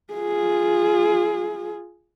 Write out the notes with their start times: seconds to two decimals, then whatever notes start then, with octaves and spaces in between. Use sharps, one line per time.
0.13 F4 G#4